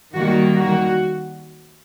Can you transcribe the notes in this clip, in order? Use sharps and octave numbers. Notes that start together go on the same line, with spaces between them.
D#3 G3 A#3 F#4
F#4